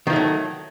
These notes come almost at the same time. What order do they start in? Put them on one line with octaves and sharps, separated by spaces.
D#3 F3 A3 F#3